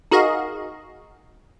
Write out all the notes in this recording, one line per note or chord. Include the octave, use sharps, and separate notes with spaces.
D#4 F#4 G#4 A#4 D#5 F5